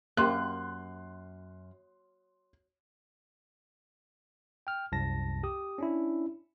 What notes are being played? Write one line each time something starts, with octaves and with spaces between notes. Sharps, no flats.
F#2 A#3 G4 C6 F#6
G5 F6
C2 F#2 A5 A#6
G4 D#6
C#4 D4 E4